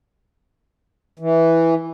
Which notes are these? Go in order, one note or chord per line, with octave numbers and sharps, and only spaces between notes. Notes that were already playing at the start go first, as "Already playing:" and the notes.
E3